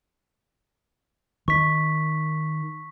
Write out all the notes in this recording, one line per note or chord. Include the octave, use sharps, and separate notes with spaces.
D#3 C#6 B6